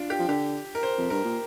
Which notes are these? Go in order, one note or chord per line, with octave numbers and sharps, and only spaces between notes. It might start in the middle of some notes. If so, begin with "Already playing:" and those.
Already playing: D4 F4
G4
F3
D3 G4
A#4
C5
F2
G2 A#4
A#2